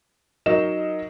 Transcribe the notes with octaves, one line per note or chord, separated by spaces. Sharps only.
F#3 D#4 A#4 D#5 E7